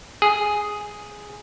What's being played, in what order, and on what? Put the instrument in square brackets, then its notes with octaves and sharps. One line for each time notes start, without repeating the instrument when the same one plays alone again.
[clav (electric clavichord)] G#4